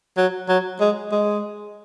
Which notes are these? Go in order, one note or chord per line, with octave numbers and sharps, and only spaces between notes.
F#3
F#3
G#3
G#3